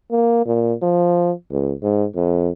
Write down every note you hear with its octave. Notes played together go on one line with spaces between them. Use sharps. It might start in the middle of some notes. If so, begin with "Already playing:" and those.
A#3
A#2
F3
C#2
G#2
F2